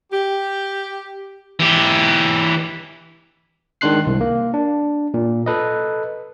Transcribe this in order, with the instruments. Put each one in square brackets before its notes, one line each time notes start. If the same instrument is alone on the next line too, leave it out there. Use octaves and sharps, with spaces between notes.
[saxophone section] G4
[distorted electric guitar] E3 G4
[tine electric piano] D#3 G#3 D4 C6 F#6 C7
C2
A#3
D4
A#2
A4 B4 D#5